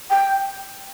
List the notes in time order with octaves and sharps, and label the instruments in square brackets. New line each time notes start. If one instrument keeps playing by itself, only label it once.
[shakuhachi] G5